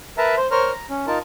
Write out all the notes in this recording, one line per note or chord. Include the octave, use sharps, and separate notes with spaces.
A#4 B4 E5 A5 A#5
C5
A#4 C5 C#5 A#5 F6
A#5
C#4
D#4 F4 A#4 A5